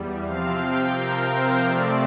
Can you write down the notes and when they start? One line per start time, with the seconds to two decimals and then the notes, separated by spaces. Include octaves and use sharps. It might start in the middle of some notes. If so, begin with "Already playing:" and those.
Already playing: E2 G3
0.23 C3 F3 C4 F5
0.59 G5
0.93 A#4
1.29 C5
1.63 C3 F3 A3 C4 D5